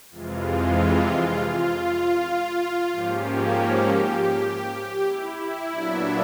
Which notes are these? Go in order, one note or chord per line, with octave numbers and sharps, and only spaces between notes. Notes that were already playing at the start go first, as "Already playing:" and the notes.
F2 C3 E3 G#3 F4
F4
G#2 F3 A#3 C#4 G4
G4
E4
A#2 F#3 B3 D4